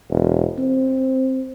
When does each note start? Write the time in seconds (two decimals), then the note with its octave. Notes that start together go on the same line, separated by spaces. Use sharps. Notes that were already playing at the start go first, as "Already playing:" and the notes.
0.10 E1
0.58 C4